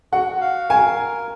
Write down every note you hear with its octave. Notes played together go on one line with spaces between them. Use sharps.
F#4 F#5
F5
A#4 G#5